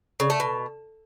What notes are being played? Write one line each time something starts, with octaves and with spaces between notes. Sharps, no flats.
C#3
A3
B2